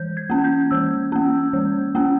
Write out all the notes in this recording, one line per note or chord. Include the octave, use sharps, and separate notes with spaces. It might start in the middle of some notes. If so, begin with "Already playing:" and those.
Already playing: E3 G6
G#6
A#3 C#4
G6
E3 E6
A#3 C#4
E3
A#3 C#4